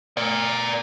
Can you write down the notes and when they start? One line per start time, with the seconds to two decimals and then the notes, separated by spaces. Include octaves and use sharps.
0.17 A#4 D5